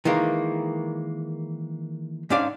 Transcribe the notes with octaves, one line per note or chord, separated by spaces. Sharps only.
D#3 E3 G#3 A#3
G#2 C#4 D4 D5 F5